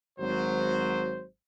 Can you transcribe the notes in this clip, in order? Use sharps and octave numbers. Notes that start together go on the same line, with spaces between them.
G#1 F#3 C5